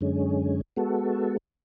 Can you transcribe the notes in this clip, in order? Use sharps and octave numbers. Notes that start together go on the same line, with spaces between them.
F#2 D3 G#3 C#4
G#3 B3 F#4 A4